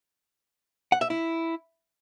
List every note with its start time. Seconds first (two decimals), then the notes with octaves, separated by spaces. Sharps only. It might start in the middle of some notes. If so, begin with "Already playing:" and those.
0.92 F#5
1.01 E5
1.10 E4